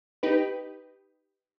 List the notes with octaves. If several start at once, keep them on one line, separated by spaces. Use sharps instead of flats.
D#4 G4 B4